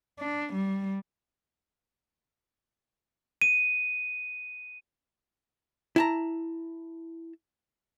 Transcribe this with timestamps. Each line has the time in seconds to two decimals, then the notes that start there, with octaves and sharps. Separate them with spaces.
0.19 D4
0.54 G3
3.42 D#7
5.96 E4 A5 A#5